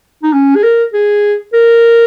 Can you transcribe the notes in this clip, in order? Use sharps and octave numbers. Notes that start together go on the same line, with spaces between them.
D#4
C#4
G#4
A#4
G#4
A#4